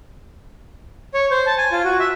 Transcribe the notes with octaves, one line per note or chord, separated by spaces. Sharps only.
C#5
C5
A5
G#5
F4
F#4
E5